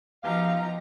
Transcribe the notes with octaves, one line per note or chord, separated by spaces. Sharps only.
B2 F3 D#4 G4 F5 A#5